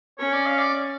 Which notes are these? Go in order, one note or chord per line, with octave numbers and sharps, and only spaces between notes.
C#4 C#5
D5
F5
D5